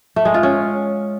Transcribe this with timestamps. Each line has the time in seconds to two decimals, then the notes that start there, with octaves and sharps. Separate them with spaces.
0.16 A3
0.25 G#3
0.34 F4
0.43 C#4